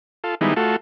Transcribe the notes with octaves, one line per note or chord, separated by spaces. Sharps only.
F4 A4
D#3 G3 G#3 B3 D#4 E4
A3 F4 F#4 A4